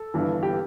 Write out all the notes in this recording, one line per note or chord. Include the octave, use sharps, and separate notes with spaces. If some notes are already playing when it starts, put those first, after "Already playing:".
Already playing: A4
G1 G2 E3
G4